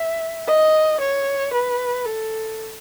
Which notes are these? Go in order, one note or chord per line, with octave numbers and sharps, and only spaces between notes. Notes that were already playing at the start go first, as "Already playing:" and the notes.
Already playing: E5
D#5
C#5
B4
A4